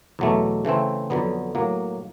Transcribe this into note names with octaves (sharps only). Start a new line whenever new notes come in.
E2 B2 F#3 A3
C#3 E3 A3 C4
F2 D3 F#3 B3
A2 F#3 A#3